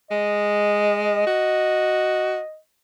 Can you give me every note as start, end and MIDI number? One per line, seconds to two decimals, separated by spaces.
0.11 1.23 56
0.11 2.58 75
1.27 2.40 66